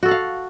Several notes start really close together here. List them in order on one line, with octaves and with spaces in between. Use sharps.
F#4 A4 F#5 F5